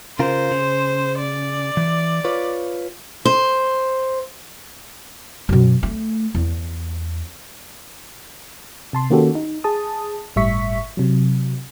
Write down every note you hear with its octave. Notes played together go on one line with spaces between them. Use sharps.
C#3 F4 A#4 C5
C#3
D5
E3
F4 B4 C#5
C5
F#2 B2
A3
E2
C3 A5 C6
D#3 A#3 C#4 F#4 G4 A4
D#4
G#4 A5 D#6
G1 A2 G3 E5 C#6 B6
C3 F#3